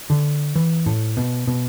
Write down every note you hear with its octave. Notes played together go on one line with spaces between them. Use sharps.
D3
E3
A2
B2
B2